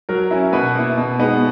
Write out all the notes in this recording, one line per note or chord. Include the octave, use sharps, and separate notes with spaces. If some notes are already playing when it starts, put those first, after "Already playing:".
F#3 A#4
C#4 E4
B2 B3 B4
A#3 E4
B2
G#3 B3 D#4